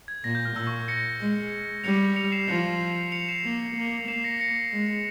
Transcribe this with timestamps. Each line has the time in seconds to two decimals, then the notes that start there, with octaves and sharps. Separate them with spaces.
0.08 G#6
0.24 A#2 A#6
0.35 G6
0.45 F6
0.56 A#2 E6
0.67 C#6
0.88 A#6 C#7
1.21 G#3
1.84 G3 C#7 F7
2.16 C#7 F7
2.32 C7 E7
2.48 F3 A#6 C#7
3.12 C#7 F7
3.28 C7 E7
3.44 A#3
3.76 A#3
4.08 A#3 C7 E7
4.24 A#6 C#7
4.40 A#6 C#7
4.72 G#3